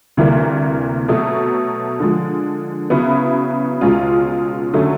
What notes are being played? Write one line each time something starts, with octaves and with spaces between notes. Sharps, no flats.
D2 C3 E3 G3 A#3
B2 F#3 A3
D3 F3 G#3
C#3 F#3 B3 E4
C#2 B2 G#3 C#4 F4
D3 F#3 A3 C#4